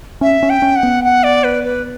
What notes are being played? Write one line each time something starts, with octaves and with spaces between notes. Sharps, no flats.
C#4 E5
C#4
G5
C#4
F#5
B3
F#5
D5
B4
B4